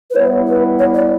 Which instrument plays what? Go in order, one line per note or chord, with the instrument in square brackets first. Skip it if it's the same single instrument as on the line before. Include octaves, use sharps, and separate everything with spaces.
[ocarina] B4
[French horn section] G3 B3 E4 [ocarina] C#5
[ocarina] B4
C#5
D5